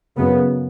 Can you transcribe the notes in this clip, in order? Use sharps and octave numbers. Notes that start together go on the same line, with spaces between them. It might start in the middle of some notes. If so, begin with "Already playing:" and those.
F#2 C#3 B3